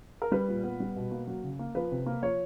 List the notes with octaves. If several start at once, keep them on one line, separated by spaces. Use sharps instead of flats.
A#4
G3 B4
A#2
B3
G3
B2
A#3
F#3
C#3
A#3
F3 B4
C3
A#3
F3 C#5